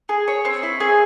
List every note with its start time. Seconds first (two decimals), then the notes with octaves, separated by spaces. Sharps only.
0.09 G#4
0.28 C#5
0.45 C4
0.63 E4
0.80 G#4